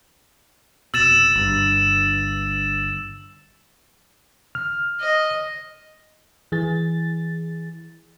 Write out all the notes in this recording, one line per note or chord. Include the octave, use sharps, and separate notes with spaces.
F1 B2 E6 A6 E7
G1 G2
F6
D#5
E3 G#4 A6